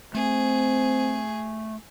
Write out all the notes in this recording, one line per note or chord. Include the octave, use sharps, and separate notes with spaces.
A3 C4 G#4